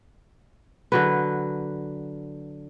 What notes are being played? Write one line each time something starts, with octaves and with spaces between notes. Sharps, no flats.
D3 F#3 B4